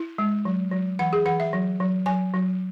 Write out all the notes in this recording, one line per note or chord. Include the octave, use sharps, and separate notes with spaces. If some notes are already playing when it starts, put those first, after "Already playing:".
Already playing: E4
G#3
F#3
F#3
E3 F#5
G#4
E3 F#5
E5
F#3
F#3
F#3 G#5
F#3